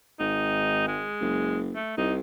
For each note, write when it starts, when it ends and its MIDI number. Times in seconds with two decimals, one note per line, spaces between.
0.20 1.09 32
0.20 0.86 63
0.88 1.60 56
1.21 1.77 30
1.75 1.93 57
1.97 2.20 36
1.97 2.14 63